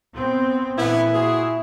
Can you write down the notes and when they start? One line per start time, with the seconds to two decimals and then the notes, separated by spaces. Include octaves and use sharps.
0.14 B3 C4
0.78 A#2 D3 E3 B3 E4
1.14 C4 F#4 G#4